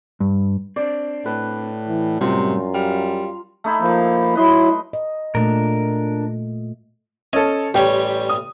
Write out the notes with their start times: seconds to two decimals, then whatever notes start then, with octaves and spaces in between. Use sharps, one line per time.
0.20 G2
0.76 C4 D4 D5
1.26 A2 B4
1.88 E3
2.21 F#2 A2 C3 G3 F4 A#5
2.74 G3 F5
3.64 A3 D#4 E4
3.81 F3 A#3
4.35 F#3 E4 B4 D#5 C6
4.93 D#5
5.35 A#2 A3 D4 A#4
7.33 C#4 A4 D#5
7.74 A1 G3 G4 C#5
8.29 D#6